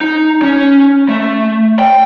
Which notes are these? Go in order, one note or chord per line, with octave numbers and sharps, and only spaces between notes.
D#4
C#4
A3
G5